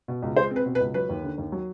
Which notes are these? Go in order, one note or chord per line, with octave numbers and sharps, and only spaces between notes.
B2
C#2
G#3 C5
C4
B4
B2
B4
C#2
F#3 B4
D#2
D3
D#2
F#3